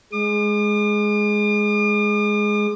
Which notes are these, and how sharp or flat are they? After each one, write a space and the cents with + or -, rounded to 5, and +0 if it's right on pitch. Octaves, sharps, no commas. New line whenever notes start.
G#3 +5 D6 +45